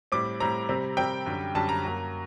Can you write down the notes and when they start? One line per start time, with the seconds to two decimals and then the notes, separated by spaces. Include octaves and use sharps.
0.12 A2 G3 C4 D6
0.40 A2 G3 C4 A#5
0.69 C3 G3 C4
0.97 C3 G3 C4 G5
1.26 F#2 D3 G3
1.55 F#2 D3 G3 A5
1.69 A#5
1.83 F#2 F#3 A#3